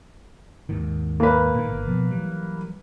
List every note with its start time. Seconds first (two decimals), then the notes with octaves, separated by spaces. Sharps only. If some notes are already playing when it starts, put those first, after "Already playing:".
0.69 D#2 G#2 D#3
1.20 A#3 B4
1.54 A#2 D#3
1.69 G1
1.88 B2 F3 B3
2.11 E3 F#3 G3